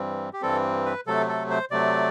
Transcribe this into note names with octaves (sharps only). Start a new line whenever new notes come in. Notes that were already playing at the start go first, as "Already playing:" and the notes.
Already playing: G2 E3 G3 C4
G4
G2 E3 G3 C4 A4
B4
C3 F#3 A3 A4
A4
C5
C3 F#3 A3 D5